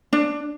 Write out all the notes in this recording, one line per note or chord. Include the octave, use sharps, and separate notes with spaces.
D4